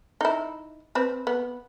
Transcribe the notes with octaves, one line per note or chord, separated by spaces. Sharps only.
D#4 E4
C4 B4
B3